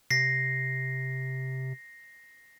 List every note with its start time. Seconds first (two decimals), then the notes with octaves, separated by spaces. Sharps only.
0.10 C3 A#6 C7